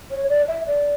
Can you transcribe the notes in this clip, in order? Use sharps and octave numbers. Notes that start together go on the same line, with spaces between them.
C#5
D5
E5
D5